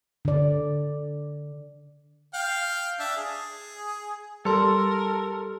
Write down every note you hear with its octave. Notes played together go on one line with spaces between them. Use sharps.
D3 D5
F5 G5
D4 E5 A5
G#4
G3 G4 A4 A#4 C6